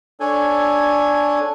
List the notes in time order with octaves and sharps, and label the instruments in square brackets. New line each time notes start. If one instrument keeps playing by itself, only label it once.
[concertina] D4 A4 C#5 G#5